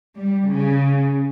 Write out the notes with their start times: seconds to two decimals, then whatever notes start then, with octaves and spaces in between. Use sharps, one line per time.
0.18 G3
0.51 C#3